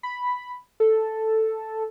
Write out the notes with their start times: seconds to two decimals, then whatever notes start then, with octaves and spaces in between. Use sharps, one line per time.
0.03 B5
0.80 A4